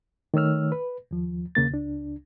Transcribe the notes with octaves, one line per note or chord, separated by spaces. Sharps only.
D#3 A3 C#5 E6 F6
B4
D#2 F3
D#2 C#3 A#3 A6
C#2 D4